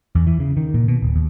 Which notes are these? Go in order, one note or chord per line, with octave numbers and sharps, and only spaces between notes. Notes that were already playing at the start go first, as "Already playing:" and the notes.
E2
E3
C#3
D#3
A#2
B2
D1
D#2